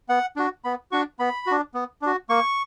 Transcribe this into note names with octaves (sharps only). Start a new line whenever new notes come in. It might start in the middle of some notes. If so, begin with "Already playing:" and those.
B3 F#5
D4 F#4
B3 B5
D4 F#4 C#6
B3 B5
D4 F#4
B3
D4 F#4
A#3 C#6